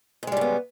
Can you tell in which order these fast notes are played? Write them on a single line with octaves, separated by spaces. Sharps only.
G#2 G#3 G3 C#3 B3